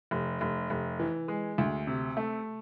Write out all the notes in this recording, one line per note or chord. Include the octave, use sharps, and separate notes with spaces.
F1
F1
F1
E3
G#3
D2
C3
A3